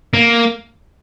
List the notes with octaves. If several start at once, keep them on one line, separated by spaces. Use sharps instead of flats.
A#3